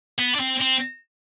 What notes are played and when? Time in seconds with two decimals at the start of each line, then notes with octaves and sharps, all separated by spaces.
0.19 B3
0.35 D4
0.40 C4
0.61 C4